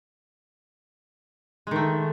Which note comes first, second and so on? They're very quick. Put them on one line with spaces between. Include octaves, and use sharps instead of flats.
G#3 D#3 A3